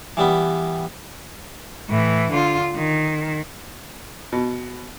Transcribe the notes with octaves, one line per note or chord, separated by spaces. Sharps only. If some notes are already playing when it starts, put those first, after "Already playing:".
E3 G3 B3
A2 E3
D3 F4
D#3
B2